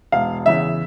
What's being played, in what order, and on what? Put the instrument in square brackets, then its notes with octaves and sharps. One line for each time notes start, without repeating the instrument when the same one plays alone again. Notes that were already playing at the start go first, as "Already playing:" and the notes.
[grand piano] E1 F5
E2 C#3 E3 E5